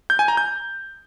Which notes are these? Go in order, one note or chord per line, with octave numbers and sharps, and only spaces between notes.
G6
G#5
A#5
G6